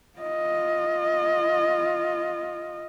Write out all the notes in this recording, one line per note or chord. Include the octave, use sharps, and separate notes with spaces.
F4 D#5